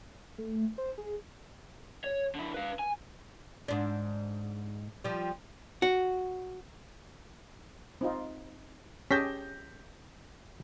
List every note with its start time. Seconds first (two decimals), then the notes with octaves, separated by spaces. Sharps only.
0.38 A3
0.78 C5
0.98 G#4
2.04 C#5
2.35 D3 E4
2.54 B4 F5
2.79 G#5
3.68 G#2 D4
5.04 F3 G3
5.82 F#4
8.01 C4 D#4 F4
9.11 C#4 G4 G#4 A5 G6 A#6 B6